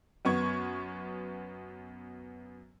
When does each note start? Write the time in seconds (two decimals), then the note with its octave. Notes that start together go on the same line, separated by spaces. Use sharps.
0.25 F#2 B3 C#6 G#6